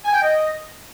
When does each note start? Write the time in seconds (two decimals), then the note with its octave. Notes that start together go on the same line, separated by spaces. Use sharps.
0.05 G#5
0.14 G5
0.23 D#5